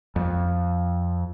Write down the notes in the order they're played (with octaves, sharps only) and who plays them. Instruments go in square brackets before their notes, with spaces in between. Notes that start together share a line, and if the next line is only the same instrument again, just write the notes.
[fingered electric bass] F2